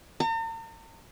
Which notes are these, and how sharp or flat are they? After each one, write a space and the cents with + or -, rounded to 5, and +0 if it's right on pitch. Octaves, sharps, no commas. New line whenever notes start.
A#5 -45